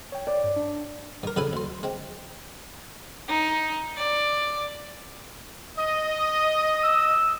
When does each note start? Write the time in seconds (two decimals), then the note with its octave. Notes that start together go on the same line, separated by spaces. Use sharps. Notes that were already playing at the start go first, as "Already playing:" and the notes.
0.12 C#5 G5
0.27 D5
0.44 G2
0.56 D4
1.23 G2 A#4
1.36 F2 C#3 A4 B4 G#5
1.53 D2 C6
1.83 G#3 C4
3.28 D#4
3.96 D5
5.79 D#5
6.83 E6